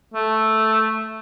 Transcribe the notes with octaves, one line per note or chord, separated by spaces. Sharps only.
A3